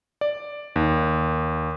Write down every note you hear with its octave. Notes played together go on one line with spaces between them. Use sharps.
D5
D#2